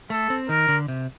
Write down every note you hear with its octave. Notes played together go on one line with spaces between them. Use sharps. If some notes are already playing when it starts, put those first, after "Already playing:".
A3 A4
C4
D#3 A#4
D3
C3